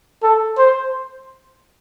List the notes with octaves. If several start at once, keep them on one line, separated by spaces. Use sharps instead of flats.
A4
C5